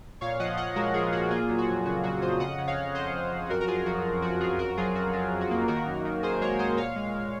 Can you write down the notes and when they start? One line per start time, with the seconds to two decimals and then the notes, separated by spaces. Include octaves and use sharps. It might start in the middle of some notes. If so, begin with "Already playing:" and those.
0.21 A#2 C#5 F5
0.39 F3 D#5 F#5
0.57 F3 D#5 F#5
0.76 G#3 F#4 A#4
0.94 F3 F4 G#4
1.12 A#2 F#4 A#4
1.31 A#3 F4 G#4
1.49 F#3
1.58 F#4
1.68 F2
1.86 C#3 F#4
2.04 F#3 F#4
2.22 F2 C5 D#5
2.40 C#3 D#5 F#5
2.58 C#3
2.67 C#5 F5
2.76 C#3
2.95 F2 C5 D#5
3.14 F2
3.31 F2
3.49 F#2 F#4 A#4
3.61 A#4
3.68 F#2 F4 G#4
3.86 F3 F#4
4.04 F#2
4.22 F3 F#4
4.41 F#2 F4 G#4
4.59 F2 F#4 A#4
4.77 F#3 F4 G#4
4.95 F2 F#4
5.13 F#3 F4
5.32 F2
5.41 F#4
5.51 A#3
5.68 D#3 F#4 A#4
5.86 F#2
6.05 D#3
6.23 D#3 G#4 C5
6.41 G#3 A#4 C#5
6.59 F#2 C5 D#5
6.77 A#2 C#5 F5
6.96 G#3
7.14 G#3